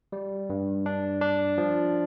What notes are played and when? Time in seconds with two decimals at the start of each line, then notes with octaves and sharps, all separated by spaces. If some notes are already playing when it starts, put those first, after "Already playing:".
0.12 G3
0.50 G2
0.86 D4
1.22 D4
1.58 F3